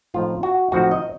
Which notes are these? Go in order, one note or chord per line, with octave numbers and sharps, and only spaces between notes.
A2 F3 C4 D#4 F4
F#4
A2 F3 C4 D#4 F#4
D#5